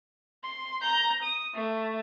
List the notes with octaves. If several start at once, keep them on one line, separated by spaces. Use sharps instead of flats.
C6
A#5 G6
D#6
A3